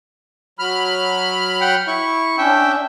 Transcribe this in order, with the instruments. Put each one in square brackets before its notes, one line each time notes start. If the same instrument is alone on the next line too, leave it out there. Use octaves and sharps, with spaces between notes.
[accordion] F#3 B5 F6
[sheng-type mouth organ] F#5 G5
E4 C#6
[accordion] C#4 D4 [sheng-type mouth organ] E5 G5